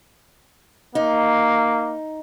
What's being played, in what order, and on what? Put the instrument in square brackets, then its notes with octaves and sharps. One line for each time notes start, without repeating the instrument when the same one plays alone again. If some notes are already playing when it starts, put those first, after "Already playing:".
[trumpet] A#3 [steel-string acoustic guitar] D#4